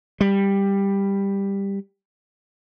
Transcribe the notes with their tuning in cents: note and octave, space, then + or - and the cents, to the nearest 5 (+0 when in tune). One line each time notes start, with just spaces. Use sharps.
G3 +10